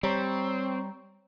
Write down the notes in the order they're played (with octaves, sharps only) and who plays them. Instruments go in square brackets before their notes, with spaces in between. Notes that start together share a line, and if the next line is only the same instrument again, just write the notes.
[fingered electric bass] G3 [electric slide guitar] C4 [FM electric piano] C#5 A#5 C#6